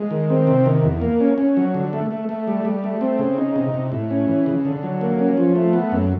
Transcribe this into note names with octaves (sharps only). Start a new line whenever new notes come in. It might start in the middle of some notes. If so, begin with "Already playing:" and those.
Already playing: G#3
D#3
C4
C3
D#3
E2
A#3
C#4
C#4
F#3
D3
A3
A3
A3
G3
G3
A3
C4
C#3
D#4
C3
C3
A2
C#4
E3
C#3
D3
F#3
A#3
C#4
F3
A3
B3
F#2